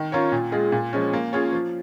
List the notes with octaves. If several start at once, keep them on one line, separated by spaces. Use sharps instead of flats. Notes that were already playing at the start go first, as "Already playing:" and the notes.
Already playing: D#3
C#4 F4 A#4 C#5
A#2
G#3 F4 G#4
A#2
F3 G#3 C#4
A#3
C#4 F4 G#4 C#5
F3